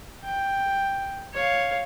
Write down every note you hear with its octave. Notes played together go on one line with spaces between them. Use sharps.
G5
C#5 F5